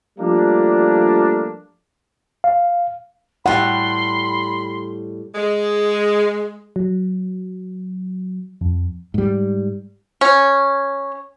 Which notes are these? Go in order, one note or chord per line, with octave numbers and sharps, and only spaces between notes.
F3 G3 A3 A#3 D4
F5
A2 G3 F#5 B5 C6
G#3
F#3
F2
G#2 G3
C#4